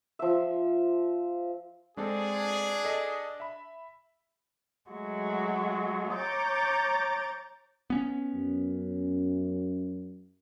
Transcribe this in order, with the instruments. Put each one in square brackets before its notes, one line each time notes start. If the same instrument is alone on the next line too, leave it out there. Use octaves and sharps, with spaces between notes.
[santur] F3 E5
[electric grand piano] G#3 C4 A4 [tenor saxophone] D4 [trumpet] G#4
[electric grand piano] A4 D#5
E5 B5
[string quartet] F#3 G#3 A3 F#4
C#5 A#5 D6 G6 A6
[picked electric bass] B3 C#4
[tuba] F#2